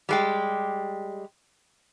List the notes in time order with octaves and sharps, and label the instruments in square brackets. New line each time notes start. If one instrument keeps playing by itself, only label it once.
[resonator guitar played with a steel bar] G3 G#3 G4